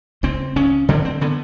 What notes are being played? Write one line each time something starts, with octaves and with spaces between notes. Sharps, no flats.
C#2 C4
C#3 C#4
D3 C4
C4
D3 B3